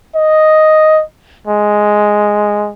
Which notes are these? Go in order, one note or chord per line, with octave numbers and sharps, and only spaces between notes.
D#5
G#3